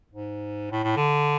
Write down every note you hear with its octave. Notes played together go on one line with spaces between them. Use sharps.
G#2
A2
A2
D3